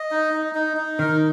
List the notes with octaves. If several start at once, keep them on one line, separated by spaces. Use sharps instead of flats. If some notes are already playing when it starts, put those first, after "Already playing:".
Already playing: D#5
D#4
D#4
D#4
D#4
D#3 A#4